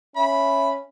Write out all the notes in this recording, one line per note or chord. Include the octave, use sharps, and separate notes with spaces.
C#4 E5 B5